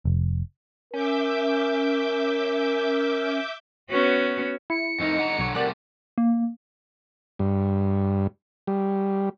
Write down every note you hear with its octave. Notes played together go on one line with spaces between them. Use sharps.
F1
C#4 A#4 E5 D6 G6
B3 C#4 F#4
E4 C#7
F2 A3 D#4 A#4 D#5
D3 F#5 A#5
B1 C#5
C3 G3 A3 A#4 D5 F#5 F#6
A#3
G2
G3